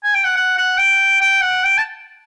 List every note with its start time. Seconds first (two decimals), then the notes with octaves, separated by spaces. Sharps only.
0.04 G#5
0.14 G5
0.24 F#5
0.36 F#5
0.57 F#5
0.77 G5
1.21 G5
1.41 F#5
1.63 G5
1.78 A5